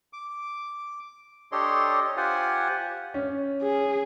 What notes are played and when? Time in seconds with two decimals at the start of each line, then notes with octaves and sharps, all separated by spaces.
0.13 D6
1.52 D4 G4 A4 C#5 D#5 C6
2.17 F4 G4 C5 F#5 G#5
3.14 C#4
3.61 G#4